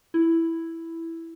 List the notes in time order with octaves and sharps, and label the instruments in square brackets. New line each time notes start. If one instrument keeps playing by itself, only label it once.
[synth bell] E4